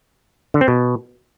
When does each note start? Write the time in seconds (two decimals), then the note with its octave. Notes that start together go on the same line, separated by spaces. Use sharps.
0.54 D3
0.61 C4
0.68 B2